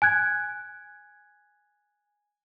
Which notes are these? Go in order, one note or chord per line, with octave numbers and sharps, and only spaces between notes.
G#5 F#6 G#6